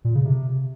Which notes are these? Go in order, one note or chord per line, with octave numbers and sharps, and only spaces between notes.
A#2
C#3
C3